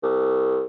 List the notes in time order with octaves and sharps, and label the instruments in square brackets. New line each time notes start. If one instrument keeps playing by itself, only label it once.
[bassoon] C2